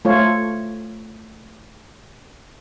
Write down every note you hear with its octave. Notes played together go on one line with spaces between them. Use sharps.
A3 F4 C#5